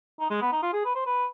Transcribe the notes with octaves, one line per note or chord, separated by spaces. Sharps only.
D#4
G#3
B3
D#4
F4
G#4
B4
C5
B4